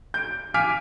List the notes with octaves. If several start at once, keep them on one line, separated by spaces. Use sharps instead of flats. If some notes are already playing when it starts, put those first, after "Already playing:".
G6 D7
F5 G#5 D6 F6 B6 D7